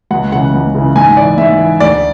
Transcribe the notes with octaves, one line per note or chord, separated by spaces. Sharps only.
C#2 F#5
C#3 E3 F#5
C#2
C#3 E3
G#2 G#5
E3 D5
G#2 E5
E3
D2 D5